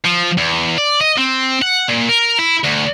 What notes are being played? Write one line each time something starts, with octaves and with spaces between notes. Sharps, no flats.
F3
E2
D5
D#5
C4
F#5
A#2
A#4
E4
D2